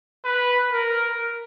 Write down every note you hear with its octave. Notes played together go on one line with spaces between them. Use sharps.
B4
A#4